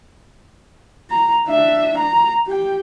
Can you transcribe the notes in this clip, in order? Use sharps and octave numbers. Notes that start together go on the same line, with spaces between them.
A#5
D4 E5
A#5
G4 G5